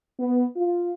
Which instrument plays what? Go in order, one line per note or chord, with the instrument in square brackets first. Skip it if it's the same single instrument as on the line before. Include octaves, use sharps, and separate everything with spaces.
[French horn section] B3
F4